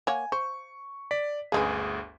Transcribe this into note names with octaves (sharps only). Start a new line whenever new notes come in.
A#3 C#5 F#5 G#5
C5 C#6
D5 B6
G1 D2 C#3 G#3 G#4 B4